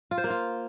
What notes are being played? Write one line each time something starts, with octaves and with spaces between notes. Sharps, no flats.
F4
C5
A#3
F4